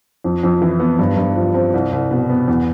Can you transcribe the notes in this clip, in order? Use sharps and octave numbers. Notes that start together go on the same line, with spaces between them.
F2
F2
E3
B3
G2
G2
F3
C4
C2
C2
B2
B3
E2